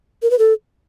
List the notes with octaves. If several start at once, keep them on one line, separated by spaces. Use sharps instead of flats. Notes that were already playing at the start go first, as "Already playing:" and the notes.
A#4
B4
A4